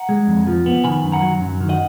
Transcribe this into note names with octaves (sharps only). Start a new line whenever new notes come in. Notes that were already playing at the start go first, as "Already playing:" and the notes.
Already playing: F#5 A#5
G#3
F2
F3
B3
D#3 G#5 B5
F#2
F#5 A#5
F#3
F#2
D#3
D#5 F#5